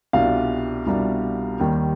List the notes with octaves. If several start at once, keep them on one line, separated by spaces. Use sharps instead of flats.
C2 B2 G3 D4 F4 F5
C2 B2 G3 D4 F4
D#2 D#3 G3